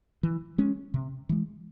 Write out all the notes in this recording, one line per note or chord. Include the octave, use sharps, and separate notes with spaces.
E3
G#3 C#4
C3
E3 G#3